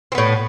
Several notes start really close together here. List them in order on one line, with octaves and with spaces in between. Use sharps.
C4 B3 A2